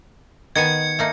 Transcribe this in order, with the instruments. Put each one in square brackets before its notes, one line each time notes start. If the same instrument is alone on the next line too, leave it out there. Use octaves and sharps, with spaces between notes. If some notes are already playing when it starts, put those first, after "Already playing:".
[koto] D#3 B3 G#5 [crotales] G#6 C#7
[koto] A3 A#3 D#4